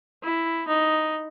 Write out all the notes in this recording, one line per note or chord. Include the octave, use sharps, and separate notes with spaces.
E4
D#4